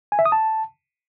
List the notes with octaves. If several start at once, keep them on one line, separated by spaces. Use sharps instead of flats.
G#5
E5
D#6
A5